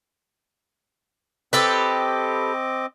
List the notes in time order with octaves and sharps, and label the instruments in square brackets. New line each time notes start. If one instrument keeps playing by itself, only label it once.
[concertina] C4 D#5 D6 [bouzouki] G4 A4 B4